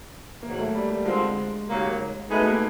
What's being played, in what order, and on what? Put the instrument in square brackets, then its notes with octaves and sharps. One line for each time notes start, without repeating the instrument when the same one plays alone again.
[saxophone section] G#2 D#3 F#3 [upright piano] A#3
[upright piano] A3
G3
G3
[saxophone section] D3 G3 C4 F4 [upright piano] G#3
[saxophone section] D#2 C#3 F#3 A#3
[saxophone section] B2 G#3 B3 D#4 G#4 [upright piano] A3
[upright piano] A#3